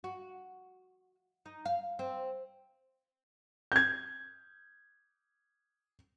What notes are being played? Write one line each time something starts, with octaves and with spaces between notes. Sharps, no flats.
F#4
D#4
F5
C4
G6 G#6